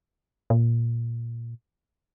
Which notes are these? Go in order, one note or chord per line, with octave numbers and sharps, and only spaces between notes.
A#2